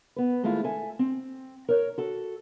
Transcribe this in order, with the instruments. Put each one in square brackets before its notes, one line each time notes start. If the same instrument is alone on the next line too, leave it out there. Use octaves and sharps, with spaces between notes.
[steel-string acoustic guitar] B3 B4
D#2 G#3 A3 E4 F4
A4 E5 G#5
C4
A#4 C#5
F#4 A4